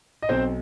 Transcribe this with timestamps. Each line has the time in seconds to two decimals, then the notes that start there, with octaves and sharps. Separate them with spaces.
0.22 D#5
0.29 B1 C4 C5